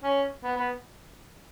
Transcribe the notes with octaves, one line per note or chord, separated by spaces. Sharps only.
C#4
B3
B3